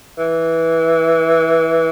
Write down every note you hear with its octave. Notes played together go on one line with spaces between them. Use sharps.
E3